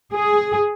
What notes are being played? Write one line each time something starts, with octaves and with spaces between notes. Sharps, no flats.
G#4